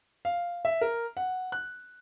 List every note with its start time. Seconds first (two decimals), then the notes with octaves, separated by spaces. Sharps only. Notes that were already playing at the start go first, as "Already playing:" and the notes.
0.25 F5
0.65 E5
0.81 A#4
1.17 F#5
1.52 F#6